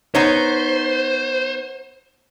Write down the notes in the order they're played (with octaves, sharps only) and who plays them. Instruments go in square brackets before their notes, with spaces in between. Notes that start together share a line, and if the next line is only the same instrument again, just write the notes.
[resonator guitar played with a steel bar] B3 D#4 C#5 [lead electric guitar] C5